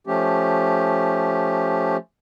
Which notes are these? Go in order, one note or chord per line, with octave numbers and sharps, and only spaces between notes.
F3 A3 C#4 G4